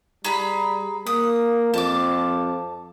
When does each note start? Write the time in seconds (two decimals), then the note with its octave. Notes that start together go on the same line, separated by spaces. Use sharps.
0.24 G3 G#4 A#5 B5
1.07 A#3 D#6
1.74 F2 A5 D6